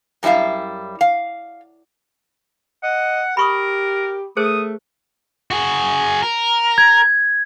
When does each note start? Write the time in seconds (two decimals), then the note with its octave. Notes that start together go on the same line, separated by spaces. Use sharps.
0.23 F#2 G3 E4 E5 F5
1.01 F5
2.83 D#5 F#5
3.37 G4 A#4 B5 C#6 D#6
4.37 A3 G#4 A#4 C5 D#6
5.51 F#4 G#4
6.23 A#4
6.78 G#6